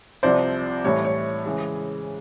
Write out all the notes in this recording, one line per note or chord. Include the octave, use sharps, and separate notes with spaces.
C2 C3 F3 C5 D5
A2 E3 G3 C#5
C#5
C#3 E3 G#3